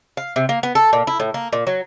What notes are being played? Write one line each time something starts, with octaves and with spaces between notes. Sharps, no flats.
F5
C3
A#3
B3
A4
A#2
E4
A2
A#3
A#2
F#3